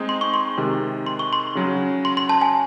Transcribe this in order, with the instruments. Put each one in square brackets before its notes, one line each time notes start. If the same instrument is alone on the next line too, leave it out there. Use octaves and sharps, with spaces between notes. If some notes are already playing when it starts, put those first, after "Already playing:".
Already playing: [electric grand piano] G#3 C4 D#4 G#4
[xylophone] C6
C#6
C6
[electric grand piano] C3 D#3 G#3
[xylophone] C6
C#6
C6
[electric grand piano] C#3 F#3 C#4 F#4
[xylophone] C6
C6
A5
G#5